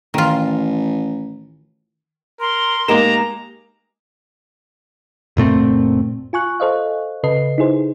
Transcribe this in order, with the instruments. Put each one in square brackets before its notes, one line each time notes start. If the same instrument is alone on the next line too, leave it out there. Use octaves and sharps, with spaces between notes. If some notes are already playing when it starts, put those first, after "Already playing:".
[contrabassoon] A1 [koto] D#3 F4
[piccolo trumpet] A#4 [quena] C6
[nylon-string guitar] G#3 G4 A#4 [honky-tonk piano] A#3 D#4 E7 [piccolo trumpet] A#5
[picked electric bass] F#1 A#2 A3 C4
[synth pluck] F4 G#5 C#6 F#6
A4 C5 D#5 F5
C#3 A4 B4 D#5 C7
D#4 E4 G#4 C5